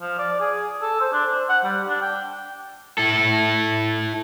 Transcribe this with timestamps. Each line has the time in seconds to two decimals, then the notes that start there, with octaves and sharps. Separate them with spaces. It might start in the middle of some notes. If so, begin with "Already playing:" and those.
0.01 F3
0.18 D5
0.41 G#4
0.82 A4
1.01 C5
1.13 D4
1.31 C5
1.49 F#5
1.64 G3
1.88 D4
2.02 G5
2.98 E4 A4